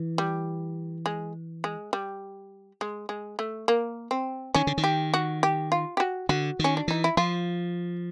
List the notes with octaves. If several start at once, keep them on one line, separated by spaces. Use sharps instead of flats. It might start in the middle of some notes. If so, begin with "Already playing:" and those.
Already playing: E3
G3
G#3
G#3
G3
G#3
G#3
A3
A#3
C4
D#3 C#4
D3
D#3
G4
F#4
G4
F4
G4
F#4
D3 F#4
D#3 C#4
D4
E3 D#4
E4
F3 F4